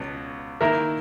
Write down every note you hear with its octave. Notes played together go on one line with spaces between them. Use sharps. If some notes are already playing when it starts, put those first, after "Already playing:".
Already playing: C#2 B2 B3
D#3 A#3 E4 A#4 E5